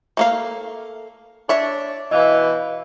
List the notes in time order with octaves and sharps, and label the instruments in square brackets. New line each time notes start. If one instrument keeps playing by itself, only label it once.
[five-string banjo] A3 A#3 F5
[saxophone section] D4 [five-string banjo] C#5 E5
[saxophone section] B2 E3 [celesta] D#5 F5